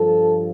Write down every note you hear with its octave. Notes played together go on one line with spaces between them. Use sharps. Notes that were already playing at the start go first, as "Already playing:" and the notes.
Already playing: G2 F3 A4